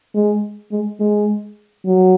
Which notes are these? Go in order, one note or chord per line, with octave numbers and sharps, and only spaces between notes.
G#3
G#3
G#3
F#3